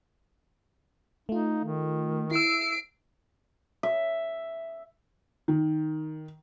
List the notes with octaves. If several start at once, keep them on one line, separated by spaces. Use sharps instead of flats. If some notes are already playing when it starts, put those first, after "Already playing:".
A3 D#4 F4
D#3
E4 E6 C7 D7
E5
D#3